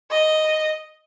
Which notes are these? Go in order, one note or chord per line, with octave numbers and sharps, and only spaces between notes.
D#5